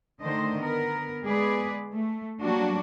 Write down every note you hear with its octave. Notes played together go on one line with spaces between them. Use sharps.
D3 D#3 A3 C5 D#5
B3 A#4
G#3 B3 G#4 B4 D5
A3
F#3 G3 A#3 D4 F#4